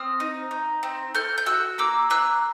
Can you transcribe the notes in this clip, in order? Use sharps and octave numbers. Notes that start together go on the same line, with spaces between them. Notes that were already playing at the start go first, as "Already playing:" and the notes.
Already playing: C4 D#6 F6
D#4
D#4
C4
A4 F6 G6
G6
F#4 E6 F#6
A#3 D6 E6
A#3 E6 F#6